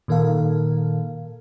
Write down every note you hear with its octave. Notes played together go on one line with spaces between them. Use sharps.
A#2 D#3 A4 A#4 F5